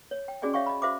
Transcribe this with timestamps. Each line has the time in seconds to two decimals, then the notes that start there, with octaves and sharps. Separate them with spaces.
0.11 C#5
0.28 G5
0.42 C#4 F#4 G#4 D5 D#5 G#5
0.54 C#5 E5 F5 G5 C#6
0.66 D#5 B5
0.82 F#4 C5 E5 F5 D6